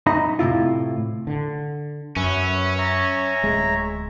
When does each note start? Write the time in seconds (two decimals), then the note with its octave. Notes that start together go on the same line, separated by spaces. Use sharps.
0.07 D#4 D#5 E5 A#5 B5
0.39 A2 C3 E4 F4
1.27 D3
2.16 F#2 C#4 B4 E5
2.78 C#5 E5 A#5
3.44 D1 G#3